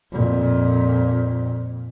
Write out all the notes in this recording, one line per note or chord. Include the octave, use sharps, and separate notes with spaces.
F2 A#2